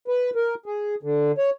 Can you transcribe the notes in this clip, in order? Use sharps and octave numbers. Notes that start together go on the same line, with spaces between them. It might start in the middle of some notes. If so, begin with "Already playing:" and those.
B4
A#4
G#4
D3
C#5